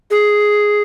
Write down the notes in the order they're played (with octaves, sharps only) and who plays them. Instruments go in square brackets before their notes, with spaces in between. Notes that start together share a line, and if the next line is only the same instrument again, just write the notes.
[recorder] G#4